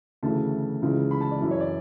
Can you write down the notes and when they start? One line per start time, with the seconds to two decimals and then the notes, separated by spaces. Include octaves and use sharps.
0.23 D2 C#3 E3 A5
0.82 C#2 C#3 E3
1.11 B5
1.21 A5
1.31 D5
1.41 F#2 E3
1.51 C#5
1.60 D5